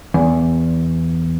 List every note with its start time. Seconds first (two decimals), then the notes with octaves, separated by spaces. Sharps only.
0.14 E2